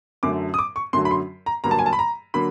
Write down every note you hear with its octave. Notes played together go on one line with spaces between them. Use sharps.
F#2 D3 F#3 A3 D6
D#6
D6
C#6
F#2 D3 F#3 A3 C6
B5
C6
A#5
G2 D3 F#3 A#3 A#5
A5
G#5
A5
B5
A#5
D3 F#3 A#3 B5